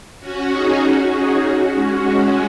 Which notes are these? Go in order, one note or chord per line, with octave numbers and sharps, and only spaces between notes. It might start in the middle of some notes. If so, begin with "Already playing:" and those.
C#4 F#4
D#4 G#4
C#4 F#4
D#4 G#4
C#4 F#4
G#3 C#4